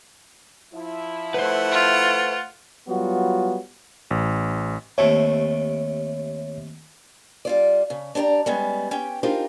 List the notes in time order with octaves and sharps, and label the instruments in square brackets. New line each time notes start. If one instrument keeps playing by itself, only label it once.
[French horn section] F3 E4
[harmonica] A3 F#5 [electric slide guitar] B4 C5
[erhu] F4
[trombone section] F#3 G3 B3 F4 F#4
[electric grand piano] A1
[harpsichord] D#2 C3 A3 [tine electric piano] C#5
[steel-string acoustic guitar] G3 F4 D5
C#3
D4 G4 D5 A#5
G3 G#3 B3 C#4
C#4 G4 G5
D4 D#4 F4 G4 A#4 C5